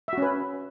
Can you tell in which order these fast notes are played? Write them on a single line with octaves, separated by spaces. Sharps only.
E5 F#4 C#4 B4